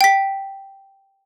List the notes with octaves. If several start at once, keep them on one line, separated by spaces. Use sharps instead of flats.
G5 B6